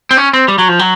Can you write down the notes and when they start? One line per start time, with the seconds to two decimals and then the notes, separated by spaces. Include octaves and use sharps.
0.11 C4
0.17 C#4
0.33 C4
0.48 G3
0.58 F#3
0.68 F3
0.79 F#3